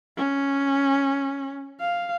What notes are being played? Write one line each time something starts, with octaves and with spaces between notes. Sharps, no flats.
C#4
F5